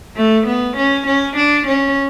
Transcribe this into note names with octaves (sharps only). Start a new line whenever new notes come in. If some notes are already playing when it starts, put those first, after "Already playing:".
A3
B3
C#4
C#4
D4
C#4